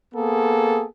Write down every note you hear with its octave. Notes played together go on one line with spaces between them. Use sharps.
A#3 B3 G#4 A4